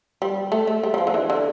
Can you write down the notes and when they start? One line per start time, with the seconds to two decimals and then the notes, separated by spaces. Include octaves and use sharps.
0.22 G3
0.52 A3
0.67 A3
0.83 G3
0.94 G3
0.98 F3
1.07 D3
1.14 E3
1.30 D3